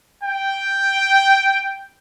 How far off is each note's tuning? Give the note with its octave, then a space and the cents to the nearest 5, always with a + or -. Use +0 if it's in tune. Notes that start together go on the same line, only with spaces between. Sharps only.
G5 +0